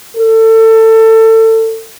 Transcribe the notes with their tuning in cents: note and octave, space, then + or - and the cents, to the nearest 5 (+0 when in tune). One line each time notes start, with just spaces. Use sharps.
A4 +25